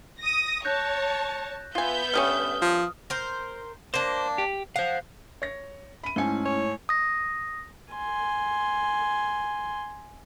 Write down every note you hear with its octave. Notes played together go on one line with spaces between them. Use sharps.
D#6 A#6
C#5 A5 F#6 G6 A#6
B3 F4 E5 G#5 G6
D3 G3 C#4 D#6 F6
F3
A#4 C5
A#3 D4 C5
G4
C5 F5 F#5
C#5 A#6
B5 D#7
G#2 A3 C#4 E4 G#5
C#5
D#6 A#6
G#5 C6